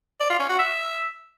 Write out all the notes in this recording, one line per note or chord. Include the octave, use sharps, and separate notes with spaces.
D5
F4
C#4
F#4
E5